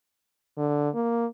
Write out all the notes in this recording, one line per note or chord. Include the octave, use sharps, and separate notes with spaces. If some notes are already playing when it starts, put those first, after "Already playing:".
D3
A#3